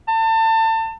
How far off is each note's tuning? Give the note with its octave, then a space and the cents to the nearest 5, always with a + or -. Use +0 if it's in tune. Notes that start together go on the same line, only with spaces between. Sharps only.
A5 +30